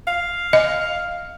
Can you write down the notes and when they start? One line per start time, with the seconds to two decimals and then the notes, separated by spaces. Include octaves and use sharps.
0.07 F5
0.53 D#5